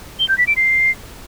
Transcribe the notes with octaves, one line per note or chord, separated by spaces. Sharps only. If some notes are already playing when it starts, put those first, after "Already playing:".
G7
G6
B6
D7
C7